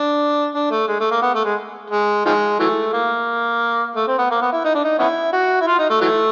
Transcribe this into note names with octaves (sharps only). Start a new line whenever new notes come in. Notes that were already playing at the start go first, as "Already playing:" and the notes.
Already playing: D4
D4
A3
G#3
A3
A#3
B3
A3
G#3
G#3
D#3 F3 G#3
E3 F#3 A3
A#3
A3
C4
B3
A#3
B3
E4
D#4
D4
D#4
B3 C#4 E4
F#4
E4
F4
D#4
A3
E3 F#3 A3